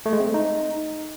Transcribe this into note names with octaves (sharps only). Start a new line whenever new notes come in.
A3
G#3
C4
A3
D#4